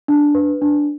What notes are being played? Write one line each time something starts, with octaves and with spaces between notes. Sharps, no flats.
D4
B4
D4